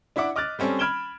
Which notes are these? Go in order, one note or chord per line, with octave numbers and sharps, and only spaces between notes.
D4 E4 E5 F#5 D6
D#5 D6 F6 F#6 A6
G3 C4 C#4 A4 D5
B5 F6 G#6 D7 E7 G7